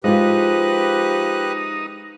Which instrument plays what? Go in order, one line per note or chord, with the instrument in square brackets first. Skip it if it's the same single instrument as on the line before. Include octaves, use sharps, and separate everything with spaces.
[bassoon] F3 [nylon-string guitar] G#3 F4 [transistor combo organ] D#4 [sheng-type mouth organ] G4 B4 F#6